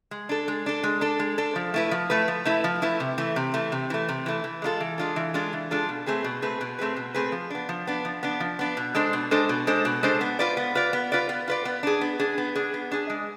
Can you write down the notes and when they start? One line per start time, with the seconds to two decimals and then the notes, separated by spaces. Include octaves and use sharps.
0.11 G#3
0.29 D4 A4
0.48 G#3
0.66 D4 A4
0.83 G#3
1.01 D4 A4
1.19 G#3
1.38 D4 A4
1.56 F3
1.74 A3 E4 B4
1.91 F3
2.10 A3 E4 B4
2.28 F3
2.45 A3 E4 B4
2.64 F3
2.82 A3 E4 B4
3.00 C3
3.18 E3 A3
3.36 C3
3.54 E3 A3
3.72 C3
3.90 E3 A3
4.08 C3
4.26 E3 A3
4.44 E3
4.62 G#3 D4 F4 A4
4.80 E3
4.98 G#3 D4 F4 A4
5.16 E3
5.34 G#3 D4 F4 A4
5.53 E3
5.71 G#3 D4 F4 A4
5.89 B2
6.06 A3 C4 G#4 B4
6.24 B2
6.42 A3 C4 G#4 B4
6.61 B2
6.79 A3 C4 G#4 B4
6.96 B2
7.14 A3 C4 G#4 B4
7.32 F3
7.50 B3 D4
7.69 F3
7.87 B3 D4
8.05 F3
8.23 B3 D4
8.40 F3
8.59 B3 D4
8.77 B2
8.95 G#3 D4 A4 C5
9.13 B2
9.31 G#3 D4 A4 C5
9.49 B2
9.67 G#3 D4 A4 C5
9.85 B2
10.03 G#3 D4 A4 C5
10.21 B3
10.39 F4 B4 D5
10.57 B3
10.75 F4 B4 D5
10.93 B3
11.12 F4 B4 D5
11.29 B3
11.48 F4 B4 D5
11.65 B3
11.83 D4 G#4
12.01 B3
12.19 D4 G#4
12.38 B3
12.55 D4 G#4
12.74 B3
12.91 D4 G#4
13.10 G#3